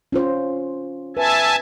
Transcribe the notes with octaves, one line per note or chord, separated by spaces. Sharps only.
C#4 F4 C5
B4 E5 G#5 A5